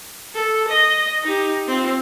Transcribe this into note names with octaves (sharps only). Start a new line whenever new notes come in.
A4
D#5
D#4 G4
C4 F4